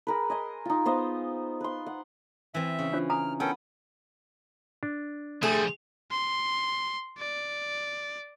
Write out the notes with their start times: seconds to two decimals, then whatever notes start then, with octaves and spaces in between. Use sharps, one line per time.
0.07 G#4 A#4 B4
0.30 D#5 G#5 C6
0.65 D#4 F4
0.85 B3 C5 D#5 F5
1.61 B4 C6
1.86 F#5
2.54 E3 C4 E5
2.79 C#3
2.93 D4 F4 C5
3.10 G#5 A#5 D#6 F6
3.40 B3 C#4 A4 A#4 G5
4.83 D4
5.43 F3 G3 A3 G#4
6.11 C6
7.18 D5